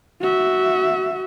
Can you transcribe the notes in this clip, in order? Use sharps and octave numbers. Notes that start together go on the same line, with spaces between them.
F#4 E5